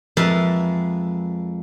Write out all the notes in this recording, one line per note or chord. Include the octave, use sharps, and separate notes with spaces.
F2 G#3 A#4 B4 E5 A5